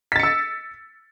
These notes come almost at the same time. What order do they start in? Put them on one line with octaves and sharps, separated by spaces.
B6 A6 C#7 E6